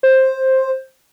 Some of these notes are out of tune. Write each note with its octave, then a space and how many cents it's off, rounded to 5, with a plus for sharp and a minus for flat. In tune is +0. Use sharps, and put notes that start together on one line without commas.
C5 +10